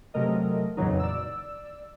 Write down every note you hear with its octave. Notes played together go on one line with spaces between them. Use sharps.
C3 F#3 A3 A#4 D#5
F2 A#2 C#3 E3 F#3 D#4
D5 E6